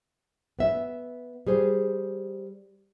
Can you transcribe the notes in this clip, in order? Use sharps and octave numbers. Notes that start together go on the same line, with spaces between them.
B3 E5
G3 G#4 C5